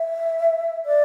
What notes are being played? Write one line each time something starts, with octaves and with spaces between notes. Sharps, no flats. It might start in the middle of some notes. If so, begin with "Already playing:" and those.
Already playing: E5
D5